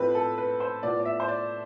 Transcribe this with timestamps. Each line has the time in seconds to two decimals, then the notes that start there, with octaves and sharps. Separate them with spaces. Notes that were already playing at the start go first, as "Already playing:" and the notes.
Already playing: A2 F3 A3 C4 B4
0.15 A4
0.38 B4
0.60 C5
0.83 A2 F3 B3 D5
1.00 D5
1.05 E5
1.20 C5
1.28 D5